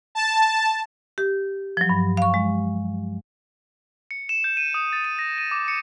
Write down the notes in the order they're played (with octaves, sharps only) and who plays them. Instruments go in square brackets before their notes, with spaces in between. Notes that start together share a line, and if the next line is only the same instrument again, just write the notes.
[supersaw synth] A5
[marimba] G4
F3 F#3
G2
F5 C#6
G#3
[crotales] C#7
E7
G6
D#7
D#6
A6
D#7
A#6
D#7
D6
C#7